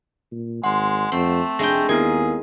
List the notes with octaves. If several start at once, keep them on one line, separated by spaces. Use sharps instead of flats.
A#2
G#1 G#3 F#5 C6
F2 A3 C4
F1 G#3 D4 E5 G5 A#6
D#2 B3 E4 G#4 A#4 G#5